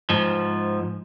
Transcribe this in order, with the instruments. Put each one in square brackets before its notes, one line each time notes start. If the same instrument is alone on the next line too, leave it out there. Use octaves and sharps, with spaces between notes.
[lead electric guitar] G#2 F3